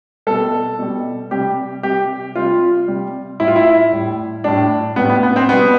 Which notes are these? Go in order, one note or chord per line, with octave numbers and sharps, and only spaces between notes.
B2 G3 A4
B2 G3
C3 G3 G4
C3 G3 G4
C3 G3 F4
C3 G3
A2 G3 E4
F4
E4
A2 G3
A2 G3 D4
A2 G3 B3
B3
B3
C4
B2 G3 B3